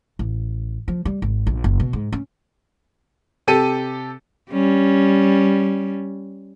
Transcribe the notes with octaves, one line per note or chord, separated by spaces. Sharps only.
A1
F3
G3
G#1
A#1
F#1
B2
G#2
C#4
C3 G4 A4 D#7
G3 C#4